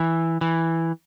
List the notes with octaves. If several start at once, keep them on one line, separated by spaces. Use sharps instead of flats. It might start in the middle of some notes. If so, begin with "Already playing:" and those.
Already playing: E3
E3